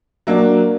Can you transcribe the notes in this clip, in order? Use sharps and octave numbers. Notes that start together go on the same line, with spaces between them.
F#3 A#3 D4